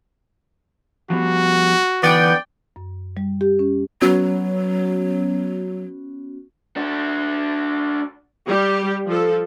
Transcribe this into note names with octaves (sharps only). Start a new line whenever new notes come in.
F3 G3 B3 F#4
D3 E3 B3 D5 G5
F#2
G3
G4
C#4
F#3 B3 C#4 F#4
D4 F#4
G3 G4
F3 A4